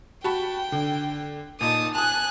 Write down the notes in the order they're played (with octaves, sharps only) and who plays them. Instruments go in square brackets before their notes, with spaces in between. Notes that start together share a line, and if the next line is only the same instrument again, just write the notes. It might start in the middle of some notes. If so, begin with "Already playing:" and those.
[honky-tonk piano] F#4 A5 B5 [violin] G5
[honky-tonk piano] D3
[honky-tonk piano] A#2 D#4 [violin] A5 D#6
[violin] G#5 F#6 [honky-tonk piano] A5 D#6